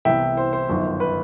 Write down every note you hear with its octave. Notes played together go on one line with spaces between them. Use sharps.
C2 C3 E3 B3 E5 G5
C5
C5
G1 F#2 D#3
B4